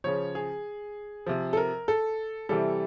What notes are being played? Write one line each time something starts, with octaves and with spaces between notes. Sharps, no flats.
C#3 F3 C#5
G#4
C3 F3
A4
A#4
A4
C3 E3 G3 A4